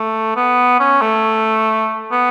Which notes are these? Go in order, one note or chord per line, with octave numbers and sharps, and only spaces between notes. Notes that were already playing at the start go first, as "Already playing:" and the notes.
Already playing: A3
B3
C#4
A3
B3